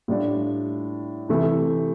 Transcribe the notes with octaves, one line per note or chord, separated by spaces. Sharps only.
A2 G3 D4 F4
C3 E3 A3 E4